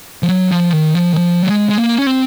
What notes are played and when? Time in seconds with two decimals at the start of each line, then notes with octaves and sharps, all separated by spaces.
0.23 F3
0.29 F#3
0.51 F3
0.73 D#3
0.95 F3
1.13 D#3
1.17 F3
1.43 F#3
1.47 G#3
1.70 G#3
1.78 A#3
1.98 C#4
2.07 C4